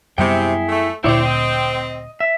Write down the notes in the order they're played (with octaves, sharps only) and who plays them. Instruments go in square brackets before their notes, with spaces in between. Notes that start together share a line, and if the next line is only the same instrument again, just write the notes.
[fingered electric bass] F#2 G3 B3 [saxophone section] C3 [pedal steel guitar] E4 G#4 G5
[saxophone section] A3
[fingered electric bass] D2 A#2 [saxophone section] C4 [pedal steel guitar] E4 C#5 D5
[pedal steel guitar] D#5
E5